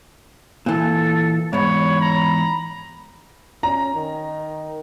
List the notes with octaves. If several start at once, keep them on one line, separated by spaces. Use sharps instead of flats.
A#2 E3 A4
E2 G#2 C#5 B5
A#5
C#4 A#5
D#3